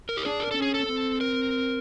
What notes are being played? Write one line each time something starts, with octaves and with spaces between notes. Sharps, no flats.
A#4
G4
D4 G#4
A#4
A4
C#4
G#4
A4
C4
A#4